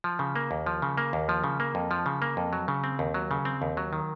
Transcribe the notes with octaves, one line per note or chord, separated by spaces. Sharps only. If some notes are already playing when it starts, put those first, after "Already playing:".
F3
C#3
A#3
D#2
F3
C#3
A#3
D#2
F3
C#3
A#3
F2
F3
C#3
A#3
F2
F#3
C#3
C4
D#2
F#3
C#3
C4
D#2
F#3
D#3